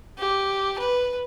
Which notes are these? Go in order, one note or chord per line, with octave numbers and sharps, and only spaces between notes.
G4
B4